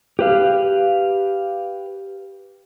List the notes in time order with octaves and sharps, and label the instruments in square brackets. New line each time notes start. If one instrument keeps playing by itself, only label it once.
[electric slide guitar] G4 B4 F5